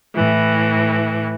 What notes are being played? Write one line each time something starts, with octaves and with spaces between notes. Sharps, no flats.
A2 E3